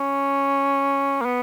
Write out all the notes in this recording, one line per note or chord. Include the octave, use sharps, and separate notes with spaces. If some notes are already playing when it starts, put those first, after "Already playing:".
Already playing: C#4
A#3
B3